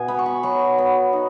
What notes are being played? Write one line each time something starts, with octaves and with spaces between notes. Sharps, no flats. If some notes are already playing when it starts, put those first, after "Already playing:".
Already playing: B2 G#5
B3 B5
C#6
B5
F#3 C#6
B3
D#4